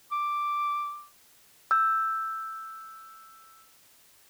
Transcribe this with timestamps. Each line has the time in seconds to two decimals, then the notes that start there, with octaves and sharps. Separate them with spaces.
0.12 D6
1.71 E6 G6